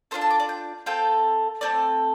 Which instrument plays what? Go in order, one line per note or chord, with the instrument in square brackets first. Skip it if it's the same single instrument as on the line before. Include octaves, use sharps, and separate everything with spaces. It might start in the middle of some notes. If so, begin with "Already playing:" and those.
[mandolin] D4 F4 A4 C5
A5
D6
D5
G5
C4 F4 A4 G5
A3 C4 A4 D5